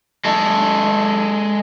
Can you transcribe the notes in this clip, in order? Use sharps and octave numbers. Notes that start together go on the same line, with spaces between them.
G#3 A4